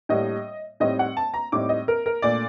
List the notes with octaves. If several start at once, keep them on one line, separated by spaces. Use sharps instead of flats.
A2 G3 A#3 D4 D#5
A2 G3 C4 D#4 D#5
F#5
A5
A#5
A2 G3 C4 D#4 D6
D#5
A#4
A#4
A#2 A3 D4 D5